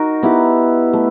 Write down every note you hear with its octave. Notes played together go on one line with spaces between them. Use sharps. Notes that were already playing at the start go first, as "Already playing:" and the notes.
Already playing: D#4 F#4 A#4
B3 E4 G4
A3